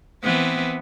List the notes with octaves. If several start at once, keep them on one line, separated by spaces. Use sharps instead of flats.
E3 B3 C4